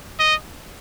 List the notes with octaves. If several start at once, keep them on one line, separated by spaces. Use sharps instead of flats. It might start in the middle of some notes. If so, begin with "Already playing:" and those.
D#5